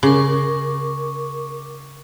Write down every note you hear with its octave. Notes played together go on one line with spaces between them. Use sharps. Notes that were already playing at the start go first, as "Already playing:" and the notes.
C#3 A#4 C#6 D6